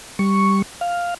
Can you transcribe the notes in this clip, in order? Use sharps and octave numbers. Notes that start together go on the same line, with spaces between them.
G3 C#6
F5